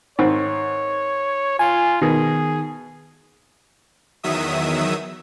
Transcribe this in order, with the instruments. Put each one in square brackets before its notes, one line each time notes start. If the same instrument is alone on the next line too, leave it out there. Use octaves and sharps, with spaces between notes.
[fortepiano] G#2 D#3 C4 [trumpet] C#5
[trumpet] F4 [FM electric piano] G#5
[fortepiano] B2 [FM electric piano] D#3 [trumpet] G#4
[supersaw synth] E2 D#3 F#3 E5 D#6